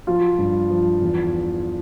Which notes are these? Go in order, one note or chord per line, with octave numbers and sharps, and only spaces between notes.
F3 F4
G2
F3
E2